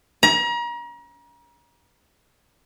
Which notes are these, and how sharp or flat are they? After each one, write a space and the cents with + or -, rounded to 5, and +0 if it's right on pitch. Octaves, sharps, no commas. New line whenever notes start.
A#5 +35